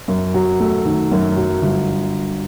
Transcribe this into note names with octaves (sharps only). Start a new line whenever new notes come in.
F#2
F#3
A3
D#3
F#2
F#3
G1